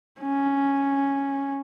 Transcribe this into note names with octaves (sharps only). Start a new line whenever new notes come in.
C#4